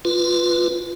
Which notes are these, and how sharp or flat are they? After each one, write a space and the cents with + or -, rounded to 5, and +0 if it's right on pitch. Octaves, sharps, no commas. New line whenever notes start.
F4 +0 B4 +0